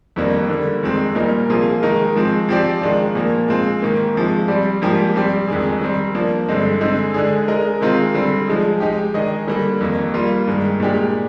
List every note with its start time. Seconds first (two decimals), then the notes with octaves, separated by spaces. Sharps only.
0.16 F2 D#3 G3 A#3 D4
0.49 D3 G3 A#3
0.83 F2 D#3 G#3 C4
1.15 A#2 G3 A#3 D#4 A#4
1.50 C3 F3 A#3 F4 G#4
1.83 D#3 G#3 D#4 A#4
2.15 G#2 F3 G#3 C4
2.49 F3 C4 G4 D5
2.82 D#3 G#3 D4 F4
3.15 A#2 F3 A#3
3.48 G#3 C4 F4
3.82 G#2 D#3 A#3
4.15 C3 F3 G#3
4.48 G3 C4 G4 D5
4.82 G#2 F3 A#3 D4 G4
5.14 G3 C4 G4 D5
5.48 F2 D#3 G#3 D4 G#4
5.81 D#3 G3 C4
6.15 F3 A#3 D4
6.48 G2 D3 G#3 C4 D#4
6.81 D3 G#3 C4 D#4 G#4
7.14 D3 G#3 D4 G#4
7.48 G#3 D#4 A#4 D#5
7.81 C3 D#3 G#3 C4 F4
8.14 D3 G3 C4
8.48 F3 G#3 D#4 G#4
8.80 G#3 D#4 G4
9.14 D#3 G#3 D4 G#4 D#5
9.47 D3 G3 A#3 D4
9.81 F2 D#3 A#3
10.14 G3 A#3 F4
10.47 G2 D#3 G#3
10.80 A#2 G#3 D4 G4